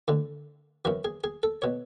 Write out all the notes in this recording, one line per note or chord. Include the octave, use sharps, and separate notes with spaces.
D2 D3
F#2 E3 F#4
G#4
G#4
A4
B2 C#5